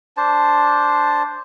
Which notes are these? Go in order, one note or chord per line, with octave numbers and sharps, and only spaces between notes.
D4 C5 A5